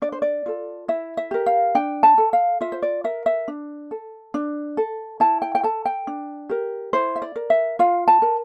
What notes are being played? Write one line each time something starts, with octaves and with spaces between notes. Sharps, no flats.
D4 D5
C5
D5
F4 A4
E4 E5
E5
G4 A#4
F5
D4 G5
A5
A4
F5
F4 E5
C5
D5
A#4 E5
E5
D4
A4
D4
A4
E4 A5
G5
G5
A4 A5
G5
D4
G4 A#4
E4 C5
E5
D5
A#4
E5
F4 F5
A5
A#4